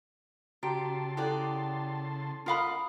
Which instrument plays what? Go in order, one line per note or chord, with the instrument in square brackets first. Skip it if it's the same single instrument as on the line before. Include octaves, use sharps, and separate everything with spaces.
[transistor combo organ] C#3 A5 C6 [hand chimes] F#4 A#5 D7 [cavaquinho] G4
[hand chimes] E4 A4 [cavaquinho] G4 D5 F#5
[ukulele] F4 F5 B5 [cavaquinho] A#4 D#5 F#5